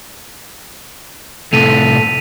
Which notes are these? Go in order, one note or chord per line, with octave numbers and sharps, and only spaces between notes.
A2 C3 A3 A4 B6 D#7 F7